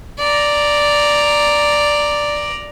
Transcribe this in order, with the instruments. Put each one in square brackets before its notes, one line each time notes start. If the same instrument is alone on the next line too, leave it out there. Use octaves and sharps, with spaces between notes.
[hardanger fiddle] D5 A#5